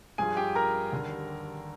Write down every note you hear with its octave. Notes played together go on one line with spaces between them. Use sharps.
G2 F3 G#4 G#5
G4 G5
A#4 A#5
D#2 D3 G3